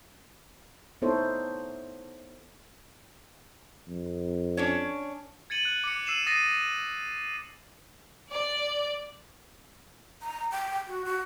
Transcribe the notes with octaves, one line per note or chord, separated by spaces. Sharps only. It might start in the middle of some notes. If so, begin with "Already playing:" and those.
B3 D#4 E4 A4 C5 C#5
F2
C#4 D4 C#5
G#6 A6 C#7 D#7 F#7
F#6 F#7
D6 C#7
E6 C7 D#7 E7 F#7
D#6 A6 A#6 C7 D#7 E7
D5
A#5
G5
F#4
F#4